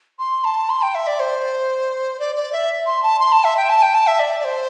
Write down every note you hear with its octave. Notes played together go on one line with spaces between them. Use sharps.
C6
A5
C6
G5
E5
D5
C5
D5
D5
E5
C6
A5
C6
A5
E5
G5
A5
G5
A5
E5
D5
D5
C5